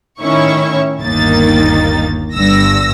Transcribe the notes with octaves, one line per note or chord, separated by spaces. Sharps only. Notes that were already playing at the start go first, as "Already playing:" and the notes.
A2 D#3 C#4 E4 C#5 C#6
G1 D#2 D#3 A#3 D#4 A6
G1 G2 E6 A#6